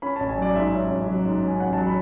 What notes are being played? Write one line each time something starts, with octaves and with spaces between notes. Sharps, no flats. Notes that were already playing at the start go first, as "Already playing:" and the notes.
C#4 B5
A5
A1
G#5
F#3 D5
G#2 E5
C#4
A1
F#3
G#2
C#4
G#5
A1 F#5
A5
F#3
B5